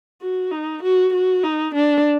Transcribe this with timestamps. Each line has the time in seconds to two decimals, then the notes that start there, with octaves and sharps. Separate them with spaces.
0.22 F#4
0.51 D#4
0.83 F#4
1.14 F#4
1.43 D#4
1.75 D4